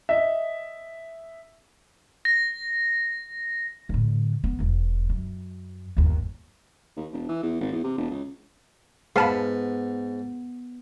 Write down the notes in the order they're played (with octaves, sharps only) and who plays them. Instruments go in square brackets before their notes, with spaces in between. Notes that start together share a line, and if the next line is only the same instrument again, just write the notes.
[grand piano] D#5 E5
[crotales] A#6
[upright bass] A2 D3
B3
E1 E2
F#2
G1 D#2
[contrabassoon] D#2
E1
E3
E2
G#1
E2
C3
E1
C#2
[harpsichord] G#2 [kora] B3 [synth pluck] F5 A5 B5